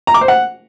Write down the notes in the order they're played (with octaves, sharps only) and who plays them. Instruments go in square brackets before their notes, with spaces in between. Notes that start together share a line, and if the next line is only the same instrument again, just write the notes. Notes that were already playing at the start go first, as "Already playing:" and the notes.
[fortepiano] A#5
D6
C5
F#5